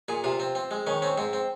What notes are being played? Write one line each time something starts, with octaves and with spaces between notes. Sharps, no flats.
A#2 G#4
C3 F4
C4
C4
G#3
D#3 C#4
C4 C#4
G#2 C4
C4